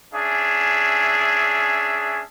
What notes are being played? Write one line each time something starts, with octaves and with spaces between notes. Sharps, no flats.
C#4 D4 G#4 E5